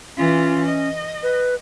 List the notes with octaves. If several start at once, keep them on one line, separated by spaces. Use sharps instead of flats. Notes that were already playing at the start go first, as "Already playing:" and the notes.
E3 C#4 F4
D#5
B4